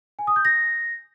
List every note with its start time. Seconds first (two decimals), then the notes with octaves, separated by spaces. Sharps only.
0.19 G#5
0.27 D#6
0.36 G6
0.45 A#6